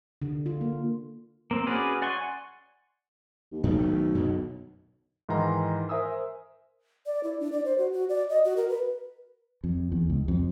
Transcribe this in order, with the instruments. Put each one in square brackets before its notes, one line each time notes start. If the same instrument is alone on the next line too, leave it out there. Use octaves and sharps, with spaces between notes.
[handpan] D3
F4
A#3
[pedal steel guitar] A#3 C4
C#4 F#4 G#4 B4 D5
D5 F#5 G#5 C6 C#6
[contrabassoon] D#2
[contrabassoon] B1 [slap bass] F2 A2 C#3
[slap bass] D#3 E3 A3
F#2 B2 D3
[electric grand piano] G#2 D#3 E3 A#5 C6
A#4 C5 E5 G#5 D#6 E6
[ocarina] D5
E4
D4
D5
C5
F#4
F#4
D5
D#5
F#4
A#4
B4
[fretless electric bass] F2
E2
C#2
F2